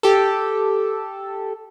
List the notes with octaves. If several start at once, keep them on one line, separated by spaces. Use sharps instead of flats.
G4 A4